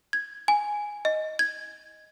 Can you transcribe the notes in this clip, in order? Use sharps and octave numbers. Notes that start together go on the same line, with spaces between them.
G#6
G#5
D#5
G#6